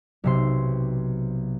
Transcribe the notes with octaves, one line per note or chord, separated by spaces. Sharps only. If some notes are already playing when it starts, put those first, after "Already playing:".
B1 C3 C6